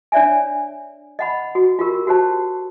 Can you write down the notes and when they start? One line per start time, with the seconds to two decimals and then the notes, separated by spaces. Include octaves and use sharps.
0.12 D4 C#5 D5 E5 G#5
1.19 D#5 F#5 B5
1.55 F#4
1.79 F4 G4 A#4
2.07 F#4 G4 C5 A5